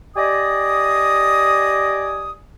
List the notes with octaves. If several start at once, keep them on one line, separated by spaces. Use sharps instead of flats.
G4 D5 D#5 G#5 D6 D#6